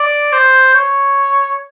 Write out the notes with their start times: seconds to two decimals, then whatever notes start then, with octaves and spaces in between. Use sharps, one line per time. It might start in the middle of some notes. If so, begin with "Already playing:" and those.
Already playing: D5
0.32 C5
0.75 C#5